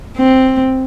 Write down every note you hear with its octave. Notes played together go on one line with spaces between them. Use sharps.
C4